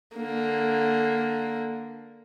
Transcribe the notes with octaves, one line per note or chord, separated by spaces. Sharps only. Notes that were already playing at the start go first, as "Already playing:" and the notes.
D3 A#3